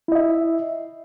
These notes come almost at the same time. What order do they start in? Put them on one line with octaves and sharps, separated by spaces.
E4 D#5 E5